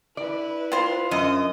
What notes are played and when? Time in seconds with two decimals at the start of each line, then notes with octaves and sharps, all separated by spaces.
0.17 E4 B4 D5
0.72 F4 C5
1.11 F#2 D#5 D#6